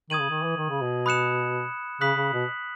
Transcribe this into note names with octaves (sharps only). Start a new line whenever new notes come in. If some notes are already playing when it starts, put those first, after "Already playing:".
D#3 D#6 G#6 D#7 F#7
C#3
D#3
E3
D#3
C#3
B2
B5 D#6 F#6 C#7 E7
C#3 D#6 F#6 B6 F#7
C#3
B2